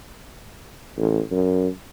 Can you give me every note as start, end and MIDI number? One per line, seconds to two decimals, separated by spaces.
0.97 1.20 33
1.31 1.68 42